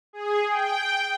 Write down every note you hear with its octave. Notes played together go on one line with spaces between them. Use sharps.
G#4
G5